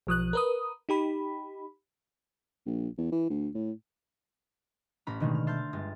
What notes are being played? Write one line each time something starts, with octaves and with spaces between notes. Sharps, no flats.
B1 F3 D#6 F#6
A#4 B4 D#6
D#4 G4 B5
A#1
E2
E3
D2
A2
A1 C#4 A#5 B5 F6
B2 D3 D#3 G#3 A3
F6
E5 A5 C6 F6 G6 A6
G1 G#3 A6